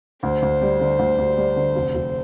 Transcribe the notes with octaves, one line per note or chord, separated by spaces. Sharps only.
D2 C5
D2
G3
D3
D2
D2
G3
D3
F1
F1